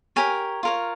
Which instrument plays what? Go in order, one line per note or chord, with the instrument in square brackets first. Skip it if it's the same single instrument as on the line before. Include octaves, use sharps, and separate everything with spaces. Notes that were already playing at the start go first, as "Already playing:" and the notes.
[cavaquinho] G4 A#4 C#5 G#5
F4 A#4 C#5